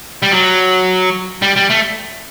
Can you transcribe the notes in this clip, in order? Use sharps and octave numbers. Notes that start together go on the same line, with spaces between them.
G3
F#3
G3
G3
A3